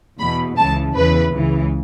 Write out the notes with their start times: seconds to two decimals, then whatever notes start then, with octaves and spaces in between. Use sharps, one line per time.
0.19 E2 B2 B5
0.57 C#2 C#3 E3 A5
0.94 E2 C#3 E3 B4
1.32 C#2 C#3 E3